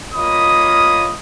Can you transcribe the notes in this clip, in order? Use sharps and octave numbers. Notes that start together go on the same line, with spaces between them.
A#3 F4 C#5 D#5 B5 D#6